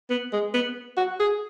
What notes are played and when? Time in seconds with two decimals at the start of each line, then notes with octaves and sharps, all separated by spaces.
0.10 B3
0.33 G#3
0.54 B3
0.97 F#4
1.20 G#4